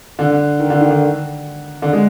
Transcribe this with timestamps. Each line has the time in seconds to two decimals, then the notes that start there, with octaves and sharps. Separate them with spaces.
0.19 D3
0.59 D#3
0.70 D3
0.81 D#3
0.91 D3
1.82 D3
1.93 G#3